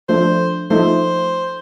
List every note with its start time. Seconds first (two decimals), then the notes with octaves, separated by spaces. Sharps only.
0.09 F3 A3 D4 C5
0.70 F3 A3 D#4 C5